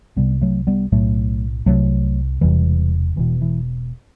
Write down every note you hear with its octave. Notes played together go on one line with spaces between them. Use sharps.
C2 C3 G3 B3
F#3 A3
G3 B3
B1 A2 F#3 A3
C2 C3 F#3 A3
E1 E2 C3 E3 G3
E1 E2 B2 E3
E3